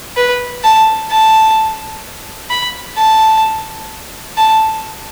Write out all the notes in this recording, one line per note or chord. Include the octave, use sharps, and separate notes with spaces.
B4
A5
A5
B5
A5
A5